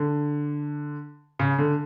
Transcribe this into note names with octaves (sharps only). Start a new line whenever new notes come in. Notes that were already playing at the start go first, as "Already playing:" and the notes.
Already playing: D3
C#3
D3